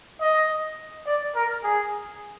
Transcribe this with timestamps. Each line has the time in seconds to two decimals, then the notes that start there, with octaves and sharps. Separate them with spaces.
0.21 D#5
1.06 D5
1.35 A#4
1.63 G#4